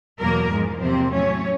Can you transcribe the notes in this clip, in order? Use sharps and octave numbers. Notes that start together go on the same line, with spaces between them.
E2 B2 F#3 A#3 A#4
G#2 F3 G#3
E2 C3 F3 A#3 C4 C5
A2 F#3 A3 C#4 C#5